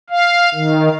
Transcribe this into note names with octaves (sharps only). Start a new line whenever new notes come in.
F5
D#3